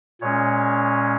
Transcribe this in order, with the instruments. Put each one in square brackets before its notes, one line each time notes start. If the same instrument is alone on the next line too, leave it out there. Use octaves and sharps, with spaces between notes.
[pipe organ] A#2 G#3 C#4 C#5